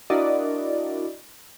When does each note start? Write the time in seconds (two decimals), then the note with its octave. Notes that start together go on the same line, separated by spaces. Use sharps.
0.10 D4 E4 F#4 A#4 D5 D#5